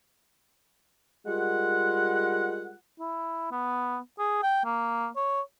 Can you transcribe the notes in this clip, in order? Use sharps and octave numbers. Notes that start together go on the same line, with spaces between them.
G3 G#3 F4 A#4 F#5
E4
B3
G#4
G5
A#3
C#5